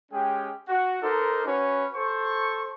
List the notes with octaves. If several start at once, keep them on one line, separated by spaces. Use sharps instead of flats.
G#3 C#4 G4 G#4 G5
F#4
D#4 A4 A#4 C5 D6
C#4 F#4 B4 C#5
A4 C5 C#6